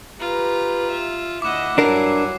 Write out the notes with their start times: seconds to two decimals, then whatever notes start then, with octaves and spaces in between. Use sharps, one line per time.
0.20 F4 G4 B4 A#5
0.90 E5
1.42 D2 E4 D#5 F#5 D6 E7
1.78 G2 F#3 D4 A#4 G#5 C7